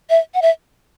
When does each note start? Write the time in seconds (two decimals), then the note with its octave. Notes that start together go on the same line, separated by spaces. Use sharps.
0.10 E5
0.34 F#5
0.42 E5